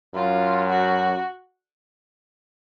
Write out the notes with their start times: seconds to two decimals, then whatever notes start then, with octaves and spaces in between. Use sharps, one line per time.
0.14 F#2 F4
0.70 F#4